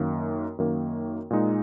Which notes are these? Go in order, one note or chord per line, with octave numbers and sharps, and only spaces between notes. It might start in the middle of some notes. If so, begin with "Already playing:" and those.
Already playing: F#2 D#3 A#3
F#2 D#3 A#3
A#2 G#3 D#4